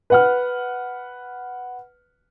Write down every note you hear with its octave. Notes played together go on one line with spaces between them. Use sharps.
B4 F#5 F6